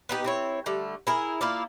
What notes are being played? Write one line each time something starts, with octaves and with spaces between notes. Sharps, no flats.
B3 D#4 G4
C4 E4 C#5
D3 G3 A3
E4 G#4 A#4
A#3 E4 F4 D5